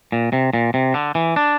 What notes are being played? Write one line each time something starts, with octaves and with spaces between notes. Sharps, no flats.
A#2
C3
A#2
C3
D3
E3
D4